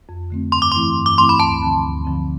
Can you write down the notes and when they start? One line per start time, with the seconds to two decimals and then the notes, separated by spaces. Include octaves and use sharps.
0.09 F2
0.30 D3 A3 C4
0.52 G2 C6
0.62 D6
0.72 E3 A3 C4 E4 C6
0.97 G2
1.06 D6
1.18 E3 A3 C4 E4 C6
1.29 B5
1.39 D2 A5
1.62 D3 F3 C4
1.83 D2
2.05 D3 F3 C4